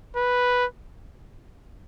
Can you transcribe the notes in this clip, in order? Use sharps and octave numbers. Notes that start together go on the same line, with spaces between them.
B4